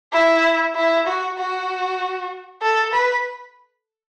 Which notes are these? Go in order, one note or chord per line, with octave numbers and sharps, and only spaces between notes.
E4
E4
F#4
F#4
A4
B4